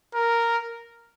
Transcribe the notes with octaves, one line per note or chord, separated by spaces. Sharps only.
A#4